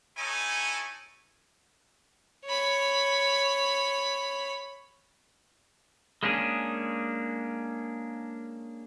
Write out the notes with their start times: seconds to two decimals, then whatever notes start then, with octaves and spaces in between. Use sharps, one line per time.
0.17 C#4 D#4 E4 A4 C#5 G#5
2.46 C#5 B5
6.23 G#3 A#3 C#4 D4 G#4